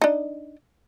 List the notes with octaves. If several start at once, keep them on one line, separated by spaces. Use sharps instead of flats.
D4 D#4